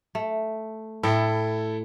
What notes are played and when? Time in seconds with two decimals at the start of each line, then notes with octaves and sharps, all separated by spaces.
0.15 A3
1.03 A2 E4 A4 G5